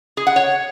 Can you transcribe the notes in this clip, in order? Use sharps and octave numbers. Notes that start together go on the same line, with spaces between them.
G#4
F#5
C#5